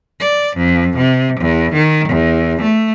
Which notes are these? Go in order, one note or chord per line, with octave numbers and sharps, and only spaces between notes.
D5
F2
C3
E2
D#3
E2
A3